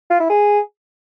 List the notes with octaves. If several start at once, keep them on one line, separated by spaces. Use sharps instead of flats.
F4
E4
G#4